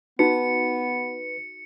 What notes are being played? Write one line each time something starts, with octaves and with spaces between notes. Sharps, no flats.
B3 D#4 F#4 B4 C#7